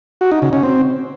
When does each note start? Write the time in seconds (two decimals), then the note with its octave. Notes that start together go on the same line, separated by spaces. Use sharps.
0.21 F#4
0.32 D#4
0.42 C#3
0.53 C#4
0.63 C4